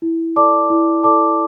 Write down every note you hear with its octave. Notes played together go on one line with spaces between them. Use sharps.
E4
A4 D5 A5 D6
E4
A4 D5 A5 D6